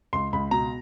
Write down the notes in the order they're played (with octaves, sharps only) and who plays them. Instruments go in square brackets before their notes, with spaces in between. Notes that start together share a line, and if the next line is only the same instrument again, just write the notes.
[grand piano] C#2 C6
C#2 B5
B2 A#5